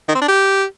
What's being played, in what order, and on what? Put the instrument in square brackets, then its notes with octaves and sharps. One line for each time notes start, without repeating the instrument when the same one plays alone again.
[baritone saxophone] D#3
C4
D4
G4